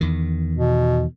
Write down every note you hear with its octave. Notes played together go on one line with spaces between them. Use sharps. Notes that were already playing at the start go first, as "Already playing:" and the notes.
E2 D#3
B2